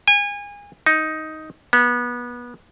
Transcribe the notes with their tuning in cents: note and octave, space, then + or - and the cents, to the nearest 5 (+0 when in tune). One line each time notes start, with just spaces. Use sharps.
G#5 -30
D#4 +10
B3 -25